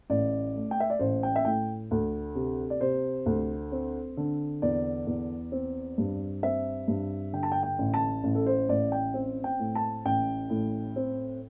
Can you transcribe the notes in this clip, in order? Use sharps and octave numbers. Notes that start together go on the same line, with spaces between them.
A1 D5
A3
G5
E5
D5
A1 C5
G5
E5
A2 G5
D2
C3
D5
C3 C5
D2
C4
D3
E2 D5
E2
C4
G2
C4 E5
G2
D3 G5
A5
G5
G5
A1
A5
A1
A4
C5
A1 D5
G5
C4
G5
A2
A5
A1 G5
A2
C4